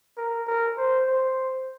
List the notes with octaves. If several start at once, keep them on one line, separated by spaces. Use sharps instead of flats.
A#4
A#4
C5
C5